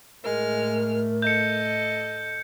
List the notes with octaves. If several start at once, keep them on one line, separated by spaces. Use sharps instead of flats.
A2 G#3 A3 A#4 F6
A4 D#5 G6 C#7